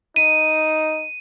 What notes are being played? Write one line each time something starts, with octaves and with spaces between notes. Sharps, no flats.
D#4 D#7